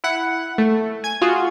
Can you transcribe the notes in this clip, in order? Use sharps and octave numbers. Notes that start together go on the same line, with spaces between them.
E4 F#5
A3
G#5 G#6
F4 F#4 G#4